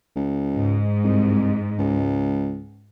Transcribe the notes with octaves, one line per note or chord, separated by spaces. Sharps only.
C#2
G#2
C2
C#2